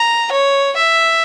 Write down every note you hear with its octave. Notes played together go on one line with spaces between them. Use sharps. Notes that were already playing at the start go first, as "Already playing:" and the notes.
Already playing: A#5
C#5
E5